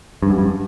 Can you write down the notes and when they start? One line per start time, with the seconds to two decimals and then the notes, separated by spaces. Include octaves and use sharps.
0.23 G2
0.30 F#2
0.38 G2